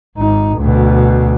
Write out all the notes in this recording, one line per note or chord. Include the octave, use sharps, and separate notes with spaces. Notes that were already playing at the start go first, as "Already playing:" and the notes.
G#1 D#4
D2 B2